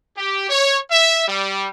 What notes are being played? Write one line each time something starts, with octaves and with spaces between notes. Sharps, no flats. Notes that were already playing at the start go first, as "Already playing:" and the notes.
G4
C#5
E5
G3